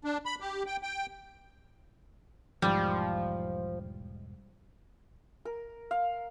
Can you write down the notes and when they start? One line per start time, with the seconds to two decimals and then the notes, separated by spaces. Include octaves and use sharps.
0.04 D4
0.26 B5
0.41 G4
0.66 G5
0.83 G5
2.62 E1 G#2 F3 G3
5.45 A#4
5.91 F5